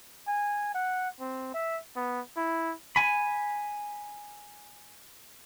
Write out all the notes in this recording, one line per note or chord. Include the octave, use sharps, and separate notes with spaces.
G#5
F#5
C4
E5
B3
E4
G#5 B5